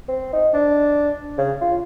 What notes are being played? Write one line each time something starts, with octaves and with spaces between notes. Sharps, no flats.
C4
D#4
D4
C#3
F4